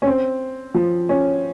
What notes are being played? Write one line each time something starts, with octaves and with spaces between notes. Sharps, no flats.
C#4
C4
F3
C#4